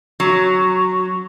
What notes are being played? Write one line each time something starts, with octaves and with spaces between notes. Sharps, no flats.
F#3